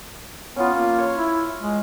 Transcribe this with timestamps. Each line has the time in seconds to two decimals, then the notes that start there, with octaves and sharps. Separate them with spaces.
0.56 B3 C#4 F4
0.74 A#3
0.99 C#5 C6
1.17 E4
1.60 G#3